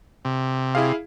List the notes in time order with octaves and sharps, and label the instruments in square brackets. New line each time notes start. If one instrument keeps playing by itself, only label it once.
[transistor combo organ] C3
[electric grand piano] E4 G#4 F5